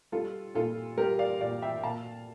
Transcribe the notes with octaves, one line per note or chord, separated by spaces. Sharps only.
G3 F4 A4
A#2 F4 A4
G3 G4 A#4
D5 F5
A#2 D5 F5
E5 G5
A#2 F5 A5